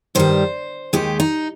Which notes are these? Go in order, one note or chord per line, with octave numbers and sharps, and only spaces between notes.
G2 D#3 G3 C5
D#2 D#3 G#3 G4
D#4